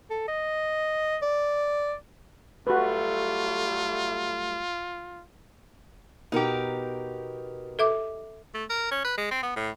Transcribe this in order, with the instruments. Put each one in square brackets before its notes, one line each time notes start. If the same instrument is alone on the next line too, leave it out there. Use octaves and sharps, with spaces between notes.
[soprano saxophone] A4
D#5
D5
[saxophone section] F#3 G3 A3 [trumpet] F4 [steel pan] F#4 B4
[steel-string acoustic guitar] B2 A#4 [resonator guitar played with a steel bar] D#4 G4
[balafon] A4 E5 D6
[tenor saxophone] A3
A#4
C#4
B4
G#3
C4
B3
A2